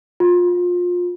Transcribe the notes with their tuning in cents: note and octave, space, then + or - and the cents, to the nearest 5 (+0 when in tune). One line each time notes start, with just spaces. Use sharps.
F4 +25